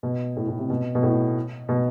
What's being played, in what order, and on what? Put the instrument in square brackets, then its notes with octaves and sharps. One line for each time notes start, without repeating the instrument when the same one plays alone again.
[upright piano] B2
A2
A2
C3
B2
B2
A2
B2